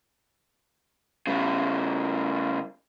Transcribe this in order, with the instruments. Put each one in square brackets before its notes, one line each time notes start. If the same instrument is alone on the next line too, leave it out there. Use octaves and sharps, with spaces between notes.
[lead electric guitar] C#3 G3